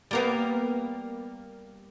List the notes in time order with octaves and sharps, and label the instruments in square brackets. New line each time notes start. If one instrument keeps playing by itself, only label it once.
[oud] G3 A#3 B3